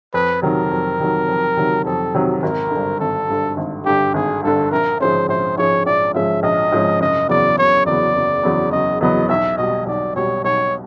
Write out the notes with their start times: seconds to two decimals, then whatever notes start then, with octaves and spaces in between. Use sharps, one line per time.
0.14 F2 B4
0.42 C3 D#3 F#3 A#4
0.71 F2
0.99 C3 D#3 F#3
1.28 F2
1.57 C3 D#3 F#3
1.85 F2 A4
2.14 C3 D#3 F#3
2.43 G#1 A#4
2.71 G2 D3
3.00 G#1 A4
3.29 G2 D3
3.57 G#1
3.86 G2 D3 G4
4.14 G#1 G#4
4.43 G2 D3 A4
4.72 A#1 A#4
5.00 G#2 F3 G#3 C#4 C5
5.29 A#1 C5
5.57 G#2 F3 G#3 C#4 C#5
5.86 A#1 D5
6.14 G#2 F3 G#3 C#4 E5
6.43 A#1 D#5
6.72 G#2 F3 G#3 C#4
7.00 F#1 D#5
7.29 E2 C#3 F#3 B3 D5
7.58 F#1 C#5
7.86 E2 C#3 F#3 B3 D5
8.15 F#1
8.43 E2 C#3 F#3 B3
8.72 F#1 D#5
9.01 E2 C#3 F#3 B3 D#5
9.29 B1 E5
9.58 B2 G3 D#5
9.86 B1 D5
10.16 B2 G3 C#5
10.44 B1 C#5